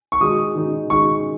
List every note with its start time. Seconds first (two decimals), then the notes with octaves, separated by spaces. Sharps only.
0.12 C#6
0.20 D#3 G#3 D#4 F#4 D#6
0.55 D#3 G#3 D#4 F#4
0.90 D#3 G#3 D#4 F#4 C#6